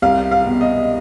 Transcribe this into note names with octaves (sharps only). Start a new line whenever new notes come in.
C2 F5
F5
B2
D#5